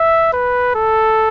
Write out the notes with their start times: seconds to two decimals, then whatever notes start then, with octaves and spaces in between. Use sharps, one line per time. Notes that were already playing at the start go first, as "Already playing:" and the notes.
Already playing: E5
0.33 B4
0.75 A4